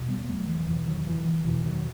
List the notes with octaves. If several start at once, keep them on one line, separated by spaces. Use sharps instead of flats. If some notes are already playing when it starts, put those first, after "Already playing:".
Already playing: E2 B2
G3 B3
E1 F#3 A3
E3
E2 B2 E3
D#3 F#3
E1 E3
E3
E2 B2 E3
D#3 F#3